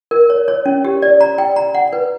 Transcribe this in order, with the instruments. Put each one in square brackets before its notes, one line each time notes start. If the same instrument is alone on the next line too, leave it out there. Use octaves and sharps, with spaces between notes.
[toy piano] A#4
C#5
C#5
C#4
G4
D5
A#5
G5
A#5
F#5
B4